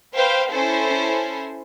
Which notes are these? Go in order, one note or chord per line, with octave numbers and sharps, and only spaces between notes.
B4 C5 F5 G5
C#4 E4 A4 C5